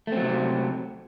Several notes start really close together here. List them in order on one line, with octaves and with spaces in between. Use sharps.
A3 C4 F#3 C3